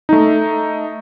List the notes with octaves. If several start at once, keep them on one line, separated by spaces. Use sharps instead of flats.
A3 D#4